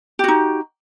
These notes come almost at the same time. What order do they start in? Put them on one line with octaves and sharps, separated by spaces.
G4 F#4 D#4